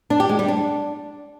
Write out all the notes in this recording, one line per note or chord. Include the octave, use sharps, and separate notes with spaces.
D4
G4
G#3
G3
D4